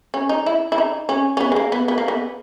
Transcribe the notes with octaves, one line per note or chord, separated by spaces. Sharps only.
C#4
D#4
E4
E4
D#4
C#4
C#4
B3
G#3
A#3
B3
B3
A#3
B3